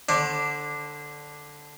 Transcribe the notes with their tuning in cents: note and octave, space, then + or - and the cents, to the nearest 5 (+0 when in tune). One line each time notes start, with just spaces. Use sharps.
D3 +0 D4 +5 C5 +45